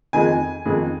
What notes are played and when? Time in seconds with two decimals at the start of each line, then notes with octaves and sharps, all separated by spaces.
0.13 F2 D#3 G#3 G#5
0.65 F2 D#3 G#3